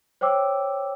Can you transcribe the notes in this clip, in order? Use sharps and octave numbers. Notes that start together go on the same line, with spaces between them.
C5 C#5 G5 D6 E6